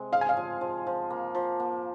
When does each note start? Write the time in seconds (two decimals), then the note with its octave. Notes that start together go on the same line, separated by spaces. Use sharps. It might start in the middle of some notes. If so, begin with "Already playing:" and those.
Already playing: C3 G#3
0.12 G#4 F5
0.21 G#5
0.29 F5
0.37 F3
0.61 F3
0.87 F3
1.10 A#3
1.35 F3
1.60 A#3